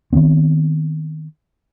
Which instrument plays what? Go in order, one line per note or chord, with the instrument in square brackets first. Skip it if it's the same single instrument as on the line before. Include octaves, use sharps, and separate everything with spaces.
[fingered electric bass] D#3 F#3 B3 C4